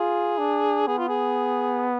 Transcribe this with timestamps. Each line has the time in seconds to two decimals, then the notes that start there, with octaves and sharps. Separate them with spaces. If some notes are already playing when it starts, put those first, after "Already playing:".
Already playing: F4 G#4
0.38 D4
0.87 B3 G#4
0.98 F4
1.09 G#4